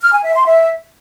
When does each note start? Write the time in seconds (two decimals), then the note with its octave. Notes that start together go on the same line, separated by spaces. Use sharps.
0.02 F6
0.13 G#5
0.24 E5
0.35 C6
0.46 E5